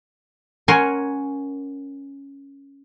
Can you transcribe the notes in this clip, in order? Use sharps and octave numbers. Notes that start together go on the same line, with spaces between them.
C#4 A#4 C#5 F#5 G#5 C6